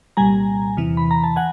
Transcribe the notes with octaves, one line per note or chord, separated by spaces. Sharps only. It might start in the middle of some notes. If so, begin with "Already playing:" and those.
C2 A#2 G3 G#5 A#5
E2 C3 E3
B5
A#5
A5
F#5 G#5